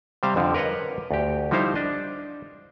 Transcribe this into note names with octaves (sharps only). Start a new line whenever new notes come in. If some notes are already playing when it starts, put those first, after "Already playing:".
C3 G3 C5 F5 A#5
F2 D3 F3
A#4 B4 C#5 D#5 F#5
D2 G4
F3 G3 D#4 E4 C5 F5
D4 D#5